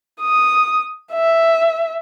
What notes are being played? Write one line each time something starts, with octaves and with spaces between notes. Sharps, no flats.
D#6
E5